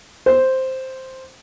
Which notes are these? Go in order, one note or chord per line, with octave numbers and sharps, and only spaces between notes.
C5